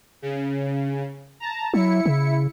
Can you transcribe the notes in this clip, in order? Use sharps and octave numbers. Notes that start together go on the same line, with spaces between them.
C#3
A5 A#5
F#3 E4 C#7
C#3